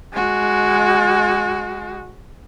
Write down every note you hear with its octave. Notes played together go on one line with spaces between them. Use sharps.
G#3 F#4